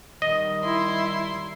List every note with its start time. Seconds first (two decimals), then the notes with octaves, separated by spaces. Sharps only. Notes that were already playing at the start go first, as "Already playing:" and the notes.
0.22 D#3 G3 D#5
0.64 E4 C6